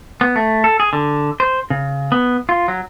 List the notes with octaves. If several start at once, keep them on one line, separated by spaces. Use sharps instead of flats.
B3
A3
A4
G#4
D3
C5
C#3
B3
F4
F#3